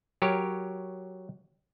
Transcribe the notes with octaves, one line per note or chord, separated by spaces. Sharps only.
F#3 G4 A#4 C#5